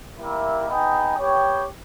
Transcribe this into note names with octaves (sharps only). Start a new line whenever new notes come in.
G3 A#3 E4 A#4 E5
B3 D#4 G#4 D#5 G5
B3 G4 C#5 G5